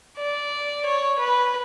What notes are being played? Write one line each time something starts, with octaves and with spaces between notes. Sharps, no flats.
D5
C#5
B4